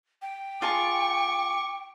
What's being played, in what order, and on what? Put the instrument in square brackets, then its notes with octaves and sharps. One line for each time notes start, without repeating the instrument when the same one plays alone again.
[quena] G5
[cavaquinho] F4 G#4 A5 [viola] C#6 [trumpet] D6